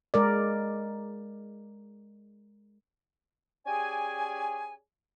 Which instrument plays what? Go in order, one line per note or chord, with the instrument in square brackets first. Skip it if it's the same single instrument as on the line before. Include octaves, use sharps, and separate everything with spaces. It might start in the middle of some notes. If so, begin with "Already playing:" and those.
[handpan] G#3 A#4 D5
[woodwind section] C#4 G4 G#4 D5 G#5